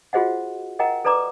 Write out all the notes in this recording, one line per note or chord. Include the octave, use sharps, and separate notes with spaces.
F4 F#4 G#4 C5 D#5 F#5
A#4 D#5 F#5 G5 A#5
A4 B4 D5 A#5 D6